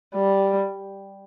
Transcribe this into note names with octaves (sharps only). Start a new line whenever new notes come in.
G3